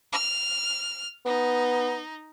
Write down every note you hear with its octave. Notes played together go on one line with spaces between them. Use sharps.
F6
B3 D#4